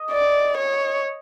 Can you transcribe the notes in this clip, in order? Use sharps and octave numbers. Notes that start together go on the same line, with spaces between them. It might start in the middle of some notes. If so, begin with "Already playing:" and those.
Already playing: D#5
D5
C#5